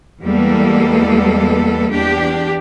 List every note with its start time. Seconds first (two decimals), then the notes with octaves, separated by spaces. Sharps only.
0.22 E2 G3 G#3 A#3 B3 A4
1.92 E2 D4 G4